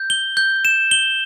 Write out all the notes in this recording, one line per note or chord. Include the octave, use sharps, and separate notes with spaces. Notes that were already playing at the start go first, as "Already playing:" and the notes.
Already playing: G6
G7
G6
E7
G7